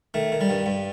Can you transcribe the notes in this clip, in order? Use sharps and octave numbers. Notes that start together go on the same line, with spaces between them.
D#3 A3
D#3
G3
G2
G2